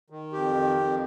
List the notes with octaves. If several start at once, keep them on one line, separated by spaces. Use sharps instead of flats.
D#3
F2 G4
D#3
F2